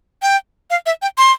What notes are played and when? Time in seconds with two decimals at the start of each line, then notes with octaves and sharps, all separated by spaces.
0.22 G5
0.70 F5
0.86 E5
1.02 G5
1.18 C6